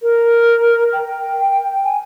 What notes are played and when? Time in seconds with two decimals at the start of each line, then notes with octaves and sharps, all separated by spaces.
0.02 A#4
0.92 G5
1.84 G#5